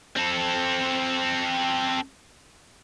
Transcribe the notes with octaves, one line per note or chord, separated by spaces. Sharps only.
C4 A4